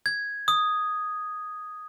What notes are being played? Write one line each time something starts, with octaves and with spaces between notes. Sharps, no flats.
G#6
D#6